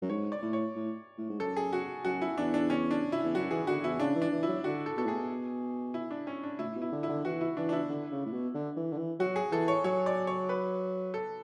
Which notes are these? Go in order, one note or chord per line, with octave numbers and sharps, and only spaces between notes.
F#2
G#2 C#5
D5
A2
C#5
A2
A2
G#2
F#2 A4
G#4
F#4
F#2 F#4
E4
E2 D4
D4
C#4
D4
E4
E2
F#2 F#4
E3 G#4
D3 F#4
E2 E4
C#3 D4
E3
D4
E3
E4
F#3
D3 F#4
A4
B2 A4
A2 G#4
B2
E4
D4
C#4
D4
A2 E4
B2
E4
D3
E4
D3
E3 F#4
E4
E3 D4
D4
E4
D3
C#3
A2
B2
D3
E3
D3
E3
F#3 F#4
G#4
E3 A4
C#5
F#3 C#5
D5
C#5
B4
A4